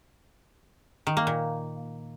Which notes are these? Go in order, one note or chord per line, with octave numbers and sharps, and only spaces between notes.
D#3
A#3
A#2